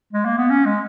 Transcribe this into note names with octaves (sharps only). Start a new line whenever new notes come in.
G#3
A#3
B3
C#4
G#3